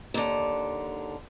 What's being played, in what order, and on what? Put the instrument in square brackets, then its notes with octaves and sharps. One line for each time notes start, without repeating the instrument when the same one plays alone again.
[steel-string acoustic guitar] D#2 D3